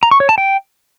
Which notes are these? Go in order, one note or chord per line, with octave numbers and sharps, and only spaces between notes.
A#5
C#6
C#5
A5
G5